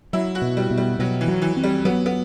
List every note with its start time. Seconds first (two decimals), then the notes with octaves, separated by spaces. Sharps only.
0.13 F#3 E4
0.35 F#4
0.42 B2
0.57 G3
0.71 B2
0.77 G3
0.99 B2 F#3
1.21 E3
1.28 F#3
1.42 E3
1.57 C4
1.64 G3
1.85 F#3 B3
2.06 B3